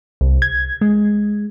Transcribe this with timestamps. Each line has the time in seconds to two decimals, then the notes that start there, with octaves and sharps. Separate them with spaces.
0.21 C2
0.42 G#6
0.81 G#3